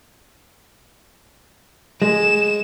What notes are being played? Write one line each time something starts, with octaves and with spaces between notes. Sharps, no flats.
G#3 E7